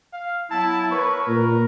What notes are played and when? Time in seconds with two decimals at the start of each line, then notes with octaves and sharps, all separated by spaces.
0.13 F5
0.51 F#3 B3 E4 A5
0.91 A#4 B4 C#5 C#6
1.27 A#2 A#4